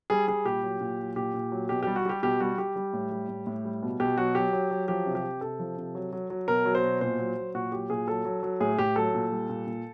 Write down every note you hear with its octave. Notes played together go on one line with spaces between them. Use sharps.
G3 G#4
G3 G#4
A#2 G4
F#3
A#2
F#3
A#2 G4
A#2
F#3
B2 G4
G3 G4
F#4
G3 G4
B2 G4
G3 F#4
G3 G4
G3
A2
G3
A2
A2
G3
B2
B2 G4
F#3 F#4
F#3 G4
F#3
F#3
F3 G4
C3
G4
C3
C3 A4
F3
C3
F#3
F#3
F#3
B2 A#4
F#3
C5
B2
A#2 C5
F#3
F#3
A#2 F#4
F#3 G4
A#2 G#4
F#3 A4
F#3
F#3
A2 G#4
A2 G4
F#3 A4
A#2
G3
A#2
A#2